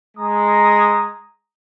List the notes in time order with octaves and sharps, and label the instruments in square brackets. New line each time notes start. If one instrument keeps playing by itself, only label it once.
[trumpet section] G#3 A#5 D#6